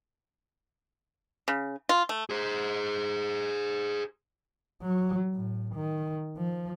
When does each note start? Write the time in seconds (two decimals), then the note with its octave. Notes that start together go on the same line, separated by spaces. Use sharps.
1.48 C#3
1.89 F4
2.09 A3
2.30 G#4 C5
4.82 F#3
5.34 A2
5.75 D#3
6.37 F3